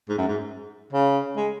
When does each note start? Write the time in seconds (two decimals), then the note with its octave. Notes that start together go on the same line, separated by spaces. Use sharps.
0.09 G#2
0.18 F#2
0.28 G#2
0.93 C#3
1.37 G#3